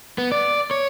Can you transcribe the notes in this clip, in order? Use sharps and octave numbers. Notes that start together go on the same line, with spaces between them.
B3
D5
C#5